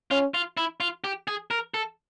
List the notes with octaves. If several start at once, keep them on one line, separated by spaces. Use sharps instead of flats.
C#4 F4
F4
E4
F4
G4
G#4
A#4
A4